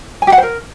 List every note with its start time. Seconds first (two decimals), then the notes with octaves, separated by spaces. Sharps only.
0.22 G#5
0.27 G4
0.32 F#5
0.38 C5
0.43 A#4